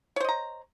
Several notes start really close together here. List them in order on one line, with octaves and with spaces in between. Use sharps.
C#5 C5 D#5 A#5